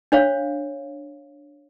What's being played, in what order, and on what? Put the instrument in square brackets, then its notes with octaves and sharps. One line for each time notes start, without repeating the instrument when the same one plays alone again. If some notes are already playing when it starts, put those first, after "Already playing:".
[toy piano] D4 C5 C#5 F5